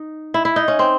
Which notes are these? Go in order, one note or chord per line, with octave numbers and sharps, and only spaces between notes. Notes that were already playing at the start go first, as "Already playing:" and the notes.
Already playing: D#4
E4
E4
D#4
C#4
C4